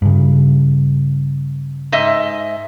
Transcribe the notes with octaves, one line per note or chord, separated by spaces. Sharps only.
G2 C#3
G#2 D#5 E5